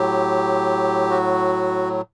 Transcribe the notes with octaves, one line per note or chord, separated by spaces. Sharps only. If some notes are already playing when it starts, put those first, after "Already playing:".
Already playing: A2 F#3 G4
F#4